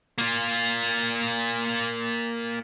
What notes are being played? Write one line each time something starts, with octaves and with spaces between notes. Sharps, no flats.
A#3 F4